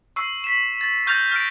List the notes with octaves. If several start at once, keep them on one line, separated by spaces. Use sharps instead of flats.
C#6 E6 C7
B6 E7
A6
C#6 F6 G6 A6 A#6 F7
F6 D7